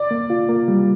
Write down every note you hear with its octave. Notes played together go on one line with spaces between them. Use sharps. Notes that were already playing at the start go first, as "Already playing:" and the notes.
Already playing: D5
A#3
F4
A#3
G3